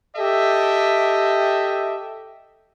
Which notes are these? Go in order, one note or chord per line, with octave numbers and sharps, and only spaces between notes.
G4 A4 D#5 E5